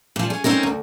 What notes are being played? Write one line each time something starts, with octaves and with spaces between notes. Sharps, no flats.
A#2 F3
C#4 G#4
C4 C#4 D#4 A#4
D2